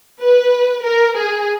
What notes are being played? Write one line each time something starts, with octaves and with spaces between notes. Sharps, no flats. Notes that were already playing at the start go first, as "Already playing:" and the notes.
B4
A#4
G#4